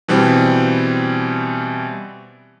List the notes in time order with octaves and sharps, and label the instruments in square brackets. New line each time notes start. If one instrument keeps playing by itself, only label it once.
[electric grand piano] B2 E3 G3 C4